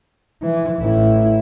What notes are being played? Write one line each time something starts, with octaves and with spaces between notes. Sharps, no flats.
E3
A1 E4